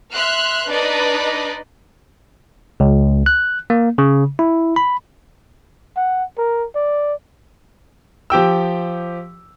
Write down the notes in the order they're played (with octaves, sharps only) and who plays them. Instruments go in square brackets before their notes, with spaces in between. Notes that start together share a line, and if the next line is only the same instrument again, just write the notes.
[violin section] E5 C6 F6 F#6
D4 D#4 B4 D5 D#5
[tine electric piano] C#2
F#6
A#3
C#3
E4
B5
[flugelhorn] F#5
A#4
D5
[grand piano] F3 G4 G5 E6